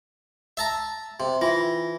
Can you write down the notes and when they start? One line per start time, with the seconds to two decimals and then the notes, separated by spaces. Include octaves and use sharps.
0.57 E5 A5 A#5
1.20 C3
1.41 E3 F4 A#6